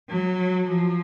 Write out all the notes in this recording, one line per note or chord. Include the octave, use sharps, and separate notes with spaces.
F#3
F3